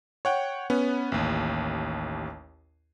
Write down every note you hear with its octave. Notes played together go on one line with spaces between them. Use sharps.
C#5 F#5 G5
B3 C#4
A1 D#2